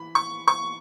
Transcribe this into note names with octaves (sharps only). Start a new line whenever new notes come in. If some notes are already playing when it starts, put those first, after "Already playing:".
Already playing: E3 B5
C#6
C#6